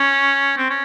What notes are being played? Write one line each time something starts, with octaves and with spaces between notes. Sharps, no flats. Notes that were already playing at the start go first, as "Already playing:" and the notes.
Already playing: C#4
C4
C#4